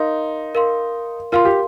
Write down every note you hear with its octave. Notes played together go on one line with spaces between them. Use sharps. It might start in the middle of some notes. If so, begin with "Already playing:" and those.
Already playing: D#4 A#4 F5 C6
A#4 F5 C6
F4 A#4 F5 C6
G4